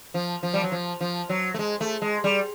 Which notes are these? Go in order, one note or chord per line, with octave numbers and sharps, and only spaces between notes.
F3
F3
G3
F#3
F3
F3
F#3
A3
G#3
A3
G#3
G3